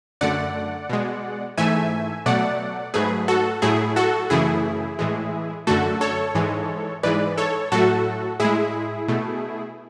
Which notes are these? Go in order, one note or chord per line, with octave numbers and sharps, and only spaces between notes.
F#2 D3 A3 D5 F#5
B2 G#3
G#2 E3 A3 E5 G#5
B2 F#3 A3 D5 F#5
G#2 F#3 A3 G#4 B4
F#4 A4
A2 F#3 A3 E4 G#4
F#4 A4
F#2 C#3 E3 A3 E4 G#4
A2 E3 G#3
F#2 D3 A3 F#4 A4
A4 C#5
G#2 E3 G#3
G#2 E3 G#3 B4 D5
A4 C#5
A2 F#3 A3 F#4 A4
A2 G#3 E4 G#4
B2 A3